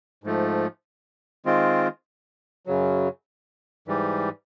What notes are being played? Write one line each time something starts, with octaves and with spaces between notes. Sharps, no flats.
G#2 F3 A3
D#3 G#3 C4 F4
F#2 C#3 F#3
G#2 E3 G3